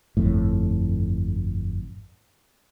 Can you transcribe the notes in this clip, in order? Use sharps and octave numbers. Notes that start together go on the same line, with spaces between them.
G1 F2 A2